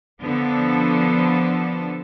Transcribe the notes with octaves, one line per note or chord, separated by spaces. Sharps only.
D3 F3 B3 D4 A4